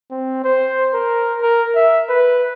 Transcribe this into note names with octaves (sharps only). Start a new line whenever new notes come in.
C4
C5
A#4
A#4
E5
B4